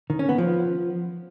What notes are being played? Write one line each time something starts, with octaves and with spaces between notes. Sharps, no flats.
D#3
C#4
B3
F3